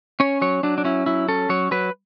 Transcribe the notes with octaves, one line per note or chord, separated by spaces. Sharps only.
C#4 C#5
F#3 C#5
F#3 D4
D4
C#4 E4
F#3 E4
C#4 A4
F#3 C#5
F#3 B4